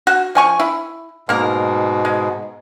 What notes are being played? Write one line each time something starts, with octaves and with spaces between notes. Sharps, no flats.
F#4
F3 G#5 C#6
E4
G#2 B2 A#3 A#4
G#3